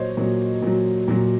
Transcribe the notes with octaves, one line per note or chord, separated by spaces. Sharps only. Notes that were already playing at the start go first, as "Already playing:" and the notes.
Already playing: A#2 F#3 C5 C#5 D#5
A#2 F#3
A#2 F#3
A#2 F#3